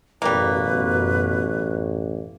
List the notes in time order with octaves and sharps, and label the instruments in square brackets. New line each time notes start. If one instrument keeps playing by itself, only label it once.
[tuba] A1 [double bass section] F#2 B2 [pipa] G3 A#3 [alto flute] B4